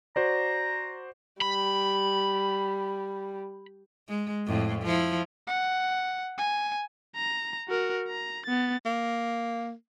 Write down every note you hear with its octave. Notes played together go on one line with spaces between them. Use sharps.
F#4 C5 D5 A#5
G3 B5
G#3
F2 A2
F3 E4
F#5
G#5
A#5
F#4 A#4
A#5
B3 A6
A#3